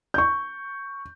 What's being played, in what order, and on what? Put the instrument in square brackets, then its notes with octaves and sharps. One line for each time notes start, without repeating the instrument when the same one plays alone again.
[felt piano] C#6 G6